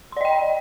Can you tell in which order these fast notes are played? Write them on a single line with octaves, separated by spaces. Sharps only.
C6 D5 D#5 G5